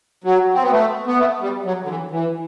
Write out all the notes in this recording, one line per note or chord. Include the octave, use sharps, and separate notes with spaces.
F#3
C4
B3
A3
B3
A3
G3
F#3
D3
E3
E3